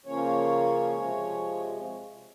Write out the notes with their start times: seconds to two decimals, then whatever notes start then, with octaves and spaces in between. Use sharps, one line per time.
0.05 C#3 F3 A#3 C#4 C#5
0.92 C3 F3 G#3